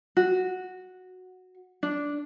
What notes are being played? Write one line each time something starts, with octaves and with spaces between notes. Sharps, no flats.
F#4
D4